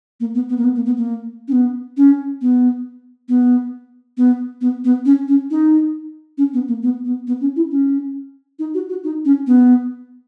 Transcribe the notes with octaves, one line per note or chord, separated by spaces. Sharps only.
A#3
B3
B3
A#3
B3
A#3
B3
A#3
C#4
B3
C#4
B3
B3
B3
B3
B3
C#4
C#4
D#4
C#4
B3
A#3
B3
B3
B3
C#4
E4
C#4
D#4
F#4
F#4
D#4
C#4
B3